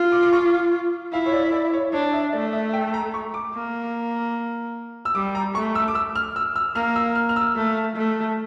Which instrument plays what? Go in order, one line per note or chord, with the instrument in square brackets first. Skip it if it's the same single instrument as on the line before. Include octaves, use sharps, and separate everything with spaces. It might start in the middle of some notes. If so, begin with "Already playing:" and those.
Already playing: [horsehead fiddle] F4
[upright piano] D6
D6
C#6
[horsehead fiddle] E4 [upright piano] F5
[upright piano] C#5
D5
D5
C#5
[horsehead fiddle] D4 [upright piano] C#5
[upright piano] E5
[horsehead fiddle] A3 [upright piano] D5
[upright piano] E5
G5
A#5
C#6
D6
[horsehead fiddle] A#3
[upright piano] E6
[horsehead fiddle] G3 [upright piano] D6
[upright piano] A#5
[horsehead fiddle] A3 [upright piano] C#6
[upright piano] E6
D6
E6
F6
E6
E6
[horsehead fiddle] A#3 [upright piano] F6
[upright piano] E6
F6
F6
E6
[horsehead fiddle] A3
A3